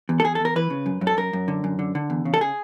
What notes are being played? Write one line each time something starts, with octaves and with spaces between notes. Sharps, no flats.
E2
A4
E2 G#4
A4
E2 A#4
E3 B4
C#3
F#2
F#2
A4
F#2 A#4
F#2
D3
F#2
D3
D3
E2
C#3
A4
G#4